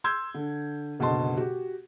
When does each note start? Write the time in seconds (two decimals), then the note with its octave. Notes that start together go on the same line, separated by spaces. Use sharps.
0.04 C6 E6 G6 G#6
0.35 D3
0.99 F#1 B2 D3 D#5 A5 C6
1.37 F#4 G4